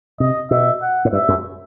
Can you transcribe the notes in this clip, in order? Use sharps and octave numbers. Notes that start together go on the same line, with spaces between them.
C3 D#5
B2 E5
F#5
A2
G2 E5
F#2